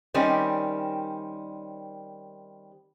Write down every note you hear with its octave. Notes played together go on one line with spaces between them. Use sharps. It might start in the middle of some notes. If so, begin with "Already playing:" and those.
D#3 G3 C4 C#4